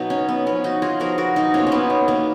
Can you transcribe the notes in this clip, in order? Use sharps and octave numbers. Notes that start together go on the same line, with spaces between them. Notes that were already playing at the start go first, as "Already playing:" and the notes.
Already playing: B2 F#3 B3 D#4
C#4
B3
F3 B3 C#4
D#4 F#4
F4 G#4
F3 B3 F#4 A#4
F#4 A#4
D#4 F#4
B2 A#3 C#4 F4
C#4
B3 D#4
C#4
B2 A#3 B3